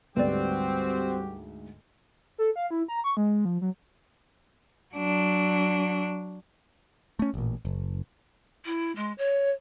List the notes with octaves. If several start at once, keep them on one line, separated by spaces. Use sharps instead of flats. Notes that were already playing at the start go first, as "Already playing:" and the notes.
D2 G#2 G3 C4 F#4 G4 B4 D5
A4
F5
E4
A#5
C#6
G#3
F3
F#3
F#3 D4
A3 C#4
A1 A#2
F#1
E4
G#3
C#5